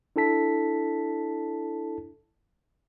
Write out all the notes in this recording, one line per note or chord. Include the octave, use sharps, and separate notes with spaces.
D4 E4 A4 A5 B6